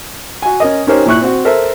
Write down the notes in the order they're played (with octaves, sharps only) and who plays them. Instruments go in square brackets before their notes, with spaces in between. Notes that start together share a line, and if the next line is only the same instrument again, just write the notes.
[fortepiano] F#4 G#5
C#4 A#4 D#5
C#4 D#4 G4 A#4 C5 C#5
A#2 E4 C#6 F#6
C4 F#4
A4 A#4 C5 E5